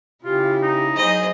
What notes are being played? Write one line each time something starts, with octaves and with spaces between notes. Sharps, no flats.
C#3 E4 F4 G4
D#4
F#3 G#4 C5 D#5